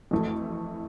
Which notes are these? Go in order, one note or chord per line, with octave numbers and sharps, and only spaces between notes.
F2 E3 A3